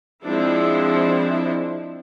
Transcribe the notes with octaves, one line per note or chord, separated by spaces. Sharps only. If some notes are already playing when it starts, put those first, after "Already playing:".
F3 G#3 C4 D4 E4